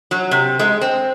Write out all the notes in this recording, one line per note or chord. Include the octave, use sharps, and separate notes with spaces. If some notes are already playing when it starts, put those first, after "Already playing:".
F#3
C3
G#3
C4